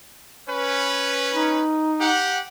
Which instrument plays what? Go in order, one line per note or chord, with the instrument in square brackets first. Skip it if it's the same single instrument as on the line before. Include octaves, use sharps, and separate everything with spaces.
[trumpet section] C#4 B4
[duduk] D#4
[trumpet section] G4 F#5